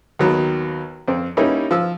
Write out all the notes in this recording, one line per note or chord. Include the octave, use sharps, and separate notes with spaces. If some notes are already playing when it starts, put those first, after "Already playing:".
D#2 D#3 F#3 B3
F2 C4
G3 A#3 C#4 D#4 E4
F3 E6